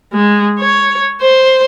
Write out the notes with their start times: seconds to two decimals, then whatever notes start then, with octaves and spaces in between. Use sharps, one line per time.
0.13 G#3
0.60 C#5
1.21 C5